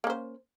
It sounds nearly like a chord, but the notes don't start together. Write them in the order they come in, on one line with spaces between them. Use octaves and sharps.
A#3 C#4 C5